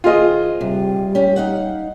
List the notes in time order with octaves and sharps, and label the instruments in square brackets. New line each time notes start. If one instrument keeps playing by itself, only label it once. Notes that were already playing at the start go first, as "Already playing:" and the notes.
[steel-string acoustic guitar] D#2 C5 [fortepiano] F4 G#4 D#5
[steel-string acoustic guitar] C3 [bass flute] G3
[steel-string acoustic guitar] C#4 G4
D#4 F5 F#5